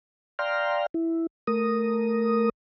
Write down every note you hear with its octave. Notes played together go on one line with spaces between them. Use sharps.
D5 F5 G5 A#5 C6 F6
E4
A3 A#4 D#6